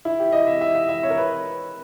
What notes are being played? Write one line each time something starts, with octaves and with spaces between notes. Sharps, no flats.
E4
G4
D#5
E5
E5
E5
E5
C#5
A#4
B4